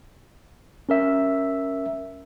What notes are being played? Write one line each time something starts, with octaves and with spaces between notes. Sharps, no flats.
C#4 A#4 E5